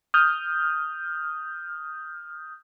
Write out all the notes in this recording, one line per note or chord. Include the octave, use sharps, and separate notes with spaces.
D#6 F6 G6